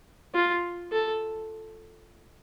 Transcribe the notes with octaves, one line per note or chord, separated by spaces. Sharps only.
F4
A4